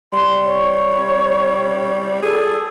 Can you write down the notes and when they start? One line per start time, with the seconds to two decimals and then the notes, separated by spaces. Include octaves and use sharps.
0.13 G3 C6
0.45 C#5
2.23 G#4 A4